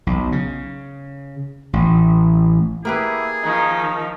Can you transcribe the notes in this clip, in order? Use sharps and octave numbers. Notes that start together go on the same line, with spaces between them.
B1
C#3
A1
A#3 E4 G4 G#4 B4
D#3 F3 D#4